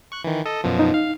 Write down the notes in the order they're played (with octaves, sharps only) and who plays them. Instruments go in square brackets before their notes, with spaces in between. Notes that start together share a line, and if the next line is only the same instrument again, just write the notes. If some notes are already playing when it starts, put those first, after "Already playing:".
[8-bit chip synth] C#6 F#6
D#3 E3
A4 D#5
F#2 B2 F3
[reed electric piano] D#4
[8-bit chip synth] F5